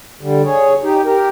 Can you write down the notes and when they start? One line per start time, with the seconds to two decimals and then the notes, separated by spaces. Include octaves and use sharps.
0.21 D3 G3
0.45 G#4 C#5
0.83 D#4 G4
1.05 G4 A#4